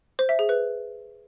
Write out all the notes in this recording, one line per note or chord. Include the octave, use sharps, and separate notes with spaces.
C5
E5
G#4
B4